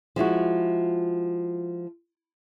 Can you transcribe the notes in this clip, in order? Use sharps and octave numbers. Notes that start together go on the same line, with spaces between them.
F3 G#3 E4 F#4